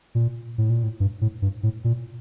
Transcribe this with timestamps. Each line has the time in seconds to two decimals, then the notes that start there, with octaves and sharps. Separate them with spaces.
0.15 A#2
0.58 A2
0.70 A#2
0.83 A2
1.00 G2
1.21 A2
1.42 G2
1.63 A2
1.84 A#2